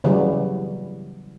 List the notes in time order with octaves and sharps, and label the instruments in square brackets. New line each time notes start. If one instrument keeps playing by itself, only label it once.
[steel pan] C#3 E3 F#3 G3